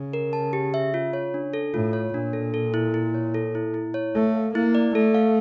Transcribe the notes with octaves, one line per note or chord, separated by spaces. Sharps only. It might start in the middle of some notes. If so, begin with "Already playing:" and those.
Already playing: C#3
A#4
A5
G4
E5
F4
C#5
D4
A4
A2 F4
C#5
A#2 D4
A4
A4
E4
E4
C#5
A4
E4
E4
C#5
A3 A4
F5
A#3 E4
D5
A3 A4
F5